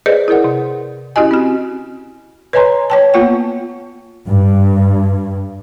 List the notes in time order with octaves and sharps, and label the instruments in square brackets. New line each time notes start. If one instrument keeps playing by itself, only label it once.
[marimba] G#4 B4 C5 D5 D#5
E4 G#4 A#4 D5 F#5
C3
C#4 E4 F#4 G4 D#5 G#5
C4 F#4
[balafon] B4 C#5 D#5 G#5 A#5 C6
C#5 G5 A5
A#3 B3 F4 F#5 G5
[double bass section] G2